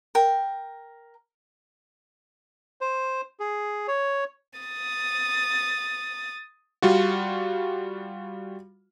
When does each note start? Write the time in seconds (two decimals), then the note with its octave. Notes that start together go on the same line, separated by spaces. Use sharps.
0.15 A#4 G5
2.81 C5
3.40 G#4
3.88 C#5
4.59 D#6 A6
6.82 G3 F4 F#4